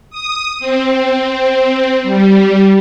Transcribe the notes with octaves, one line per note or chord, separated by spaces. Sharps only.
D#6
C4
G3